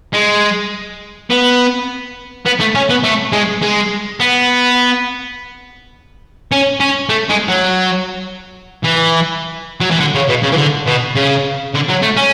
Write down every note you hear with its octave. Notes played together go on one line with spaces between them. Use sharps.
G#3
B3
B3
A3
C#4
B3
A3
G#3
G#3
B3
C#4
C#4
A3
G#3
F#3
E3
F#3
E3
D3
C#3
B2
C#3
E3
D3
B2
C#3
D3
F#3
A3
C#4